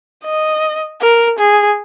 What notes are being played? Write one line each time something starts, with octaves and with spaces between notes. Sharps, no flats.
D#5
A#4
G#4